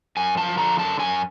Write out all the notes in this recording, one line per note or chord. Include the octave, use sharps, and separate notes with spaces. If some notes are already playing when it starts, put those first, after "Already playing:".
F#2 G#5
F3 A5
D3 A#5
F#2 A5
F#2 G#5